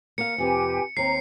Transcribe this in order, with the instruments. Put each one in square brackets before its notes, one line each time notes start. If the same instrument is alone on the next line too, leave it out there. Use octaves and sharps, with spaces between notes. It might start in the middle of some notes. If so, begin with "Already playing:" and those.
[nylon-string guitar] A#3 F5 [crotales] C#7
[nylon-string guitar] F2 C3 [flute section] G4 B4 G#5
[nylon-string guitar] D#2 C4 [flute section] A#5 [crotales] C7